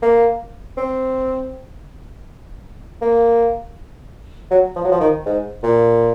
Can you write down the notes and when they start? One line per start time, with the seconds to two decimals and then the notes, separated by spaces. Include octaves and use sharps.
0.02 A#3
0.77 C4
3.01 A#3
4.51 F#3
4.76 F3
4.84 F#3
4.92 F3
5.01 D#3
5.26 G#2
5.63 A#2